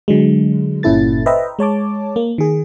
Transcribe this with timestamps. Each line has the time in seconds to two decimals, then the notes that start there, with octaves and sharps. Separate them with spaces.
0.08 D3 F#3 G#3
0.83 G1 A#2 C#4 E4 A4 A6
1.26 B4 C5 D#5 E5 G5 A#5
1.59 G#3 C#5 A5 D6
2.16 A#3
2.38 D#3 G#4